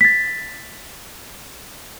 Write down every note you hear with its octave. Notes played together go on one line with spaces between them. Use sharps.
A6 B6